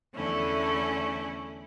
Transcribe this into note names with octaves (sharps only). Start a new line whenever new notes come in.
E2 D3 A3 C#4 E4